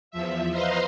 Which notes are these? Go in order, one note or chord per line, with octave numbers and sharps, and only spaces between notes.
E2 F3 E5
B4 C5 D#5 F5 A#5 C6